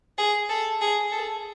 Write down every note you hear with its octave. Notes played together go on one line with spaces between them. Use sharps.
G#4
A4
G#4
A4